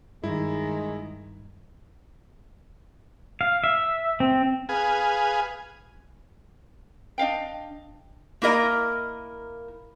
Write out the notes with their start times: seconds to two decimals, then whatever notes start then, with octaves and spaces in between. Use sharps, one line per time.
0.24 G2 D#3 G#3 E4
3.41 F5
3.64 E5
4.20 C4
4.69 G#4 B4 F5 G#5
7.18 D4 D#5 F5 G5
8.42 A#3 E4 A#4 D#5